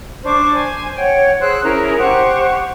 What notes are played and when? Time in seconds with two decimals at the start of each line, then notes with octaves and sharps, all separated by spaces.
0.25 D4 C5 C#6 D6
0.54 C5 G#5
0.96 C#5 F#5 G5
1.40 G#4 C5 E6 F#6
1.63 C#4 E4 G#4 A#4
1.99 G4 C5 F#5 C#6